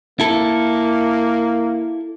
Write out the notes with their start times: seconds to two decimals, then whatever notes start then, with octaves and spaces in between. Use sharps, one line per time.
0.20 A#3 E4 A4